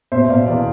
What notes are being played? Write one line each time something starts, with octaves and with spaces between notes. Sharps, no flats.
B2 C5 E5
B2 D5 F5
E2 D5 F5